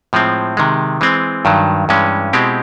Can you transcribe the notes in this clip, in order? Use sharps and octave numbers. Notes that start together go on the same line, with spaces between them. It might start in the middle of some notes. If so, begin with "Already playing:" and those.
A2 F3 G#3 C4
C3 D#3 G#3
E3 G#3 C4
G2 D#3 F#3
G2 E3 G#3 C#4
B2 G#3 C4 E4 G4